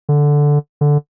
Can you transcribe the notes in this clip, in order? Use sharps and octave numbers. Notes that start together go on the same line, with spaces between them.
D3
D3